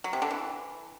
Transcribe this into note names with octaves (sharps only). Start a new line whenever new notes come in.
F#3
C3
D3
E3